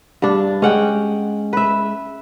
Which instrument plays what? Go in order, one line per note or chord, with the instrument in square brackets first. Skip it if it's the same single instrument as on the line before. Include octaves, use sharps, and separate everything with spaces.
[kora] G2 D4
[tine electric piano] G#3 [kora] C#4 F#5 G5
[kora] B4 E5